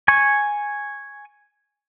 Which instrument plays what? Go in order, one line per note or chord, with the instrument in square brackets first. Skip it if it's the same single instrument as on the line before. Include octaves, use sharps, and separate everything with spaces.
[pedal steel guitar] G#5 C#6